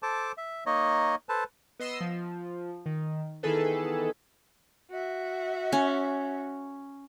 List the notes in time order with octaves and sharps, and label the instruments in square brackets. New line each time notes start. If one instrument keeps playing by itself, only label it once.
[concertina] A4 C5 A5 D6
E5
A#3 D#4 C#5 D#5
A4 B4 C5 A5
[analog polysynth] B3 D#5 C6 E6
F3
D#3
D#3 E3 B3 G#4 A4 B4
[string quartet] F#4 E5
[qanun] C#4